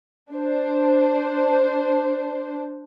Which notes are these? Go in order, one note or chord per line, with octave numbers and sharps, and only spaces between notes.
D4 C5